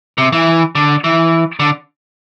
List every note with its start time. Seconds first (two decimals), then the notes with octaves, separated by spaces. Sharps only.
0.18 C3
0.33 E3
0.75 D3
1.04 E3
1.60 D3